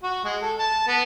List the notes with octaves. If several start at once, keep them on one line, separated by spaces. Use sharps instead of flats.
F#4
G#3
A4
A5
B3